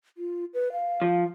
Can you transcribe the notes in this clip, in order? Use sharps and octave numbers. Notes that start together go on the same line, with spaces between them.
F4
B4
F5
F3